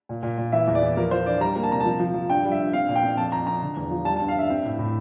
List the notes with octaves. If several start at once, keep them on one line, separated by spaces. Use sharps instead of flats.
A#2
A#2
A#2
E3 E5
E2
D5
E3
F3 A#4
F3 C5
D4 D5
G3 A#5
A#3
A5
C3 A#5
F3 A5
F3
F3
G2 G5
G3
E5
G2
C4 F5
A#2
G5
C4
F2 A5
F2 A#5
F2 A#5
D3
E2
F3
G3 A5
G2 A5
F5
G2 E5
C4
A2
A2